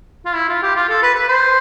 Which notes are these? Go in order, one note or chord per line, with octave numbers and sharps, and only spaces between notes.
F4
E4
F4
G4
F4
A4
B4
B4
C5